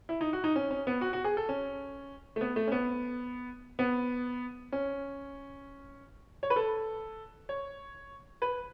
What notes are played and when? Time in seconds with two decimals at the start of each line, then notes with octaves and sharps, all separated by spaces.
0.09 E4
0.21 D#4
0.33 F#4
0.44 D#4
0.56 C#4
0.71 C#4
0.87 B3
1.01 F#4
1.13 F#4
1.24 G#4
1.37 A4
1.49 C#4
2.36 A3
2.41 B3
2.56 A3
2.67 C#4
2.72 B3
3.79 B3
4.72 C#4
6.43 C#5
6.50 B4
6.56 A4
7.49 C#5
8.42 B4